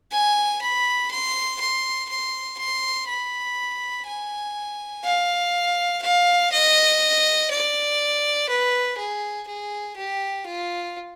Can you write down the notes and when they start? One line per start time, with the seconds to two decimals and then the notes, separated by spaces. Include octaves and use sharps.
0.12 G#5
0.62 B5
1.11 C6
1.61 C6
2.09 C6
2.59 C6
3.08 B5
4.06 G#5
5.04 F5
6.02 F5
6.52 D#5
7.51 D5
8.49 B4
8.98 G#4
9.47 G#4
9.97 G4
10.46 F4